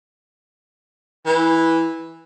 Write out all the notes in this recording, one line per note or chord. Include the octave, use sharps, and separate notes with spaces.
E3